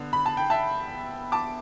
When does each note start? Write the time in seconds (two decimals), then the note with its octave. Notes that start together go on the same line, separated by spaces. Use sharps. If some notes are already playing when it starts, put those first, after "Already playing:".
Already playing: D3 B3
0.13 B5
0.26 A5
0.37 G5
0.50 E5 A5
1.32 A5 D6